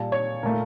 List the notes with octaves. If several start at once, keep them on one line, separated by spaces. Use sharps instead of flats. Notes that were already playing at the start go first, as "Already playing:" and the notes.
Already playing: A#2 G3 A5
C#5
A#2 A3 A#4